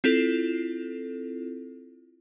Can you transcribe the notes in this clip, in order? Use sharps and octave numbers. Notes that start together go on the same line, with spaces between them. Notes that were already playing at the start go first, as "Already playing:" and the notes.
C4 E4 F4 A4